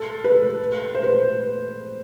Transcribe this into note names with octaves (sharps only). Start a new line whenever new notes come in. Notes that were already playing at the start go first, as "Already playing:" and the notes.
Already playing: A4
B4
C5
B4